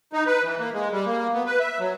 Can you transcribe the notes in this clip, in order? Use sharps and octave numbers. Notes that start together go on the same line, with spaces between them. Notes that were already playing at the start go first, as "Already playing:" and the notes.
D#4
B4
E3
A#3
G#3
G3
A#3
B3
B4
E5
F#3